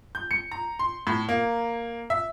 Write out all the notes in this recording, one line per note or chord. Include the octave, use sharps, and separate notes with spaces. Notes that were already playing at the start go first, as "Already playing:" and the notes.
G6
C#7
A#5
C6
A2
A#3
E5